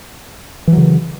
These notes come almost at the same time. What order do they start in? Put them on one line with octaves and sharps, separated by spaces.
E3 F#3 C#3